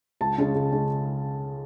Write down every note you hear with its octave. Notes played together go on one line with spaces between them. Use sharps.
C#2 A5
C#3 G#3 C#4
C#2
C#3 G#3 C#4